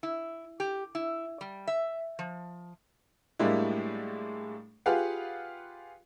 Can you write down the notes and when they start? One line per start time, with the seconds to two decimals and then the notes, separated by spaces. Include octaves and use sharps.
0.03 E4
0.60 G4
0.95 E4
1.41 G3
1.67 E5
2.19 F3
3.39 A2 G3 G#3 A#3 D4 E4
4.86 F4 G4 G#4 B4 F5 F#5